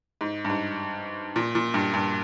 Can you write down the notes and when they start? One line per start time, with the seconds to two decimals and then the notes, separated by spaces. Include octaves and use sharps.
0.21 G#2
0.45 G2
0.50 G#2
1.36 A#2
1.55 A#2
1.74 G2
1.94 G2